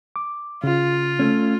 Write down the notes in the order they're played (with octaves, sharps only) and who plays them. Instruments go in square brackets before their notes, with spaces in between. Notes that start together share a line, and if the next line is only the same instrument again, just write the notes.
[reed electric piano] D6
[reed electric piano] C#3 [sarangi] F4
[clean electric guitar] A3 C#4